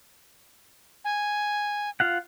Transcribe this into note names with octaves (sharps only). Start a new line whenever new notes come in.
G#5
F4 F5 F#5